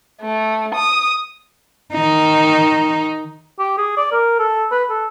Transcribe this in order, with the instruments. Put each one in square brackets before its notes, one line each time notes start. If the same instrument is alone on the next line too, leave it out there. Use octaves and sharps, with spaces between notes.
[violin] A3
D#6
[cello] D#3 D#4
[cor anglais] G4
G#4
D5
A#4
A4
B4
A4